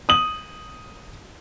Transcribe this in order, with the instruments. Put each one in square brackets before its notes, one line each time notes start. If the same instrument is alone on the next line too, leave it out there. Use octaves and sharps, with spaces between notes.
[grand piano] D#6 F#7